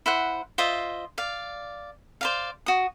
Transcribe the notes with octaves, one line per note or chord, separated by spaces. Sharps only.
E4 C5 F#5
F4 C5 D#5 E5
D5 F5
C5 D5 F5
F#4 D#6